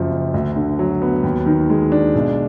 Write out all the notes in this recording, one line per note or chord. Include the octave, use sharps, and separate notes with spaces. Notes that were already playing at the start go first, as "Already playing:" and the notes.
Already playing: F#1 F#2 F3
F#1
D2
D3
F#3
B3
D#2
D#3
G#3
D4
B1